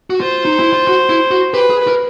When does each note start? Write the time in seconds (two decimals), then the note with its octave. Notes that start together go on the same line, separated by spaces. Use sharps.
0.10 F#4
0.21 F4 C5
0.45 D#4
0.60 E4
0.73 F4
0.87 F#4
1.09 E4
1.31 F#4
1.54 G4 B4
1.70 G#4
1.88 A#4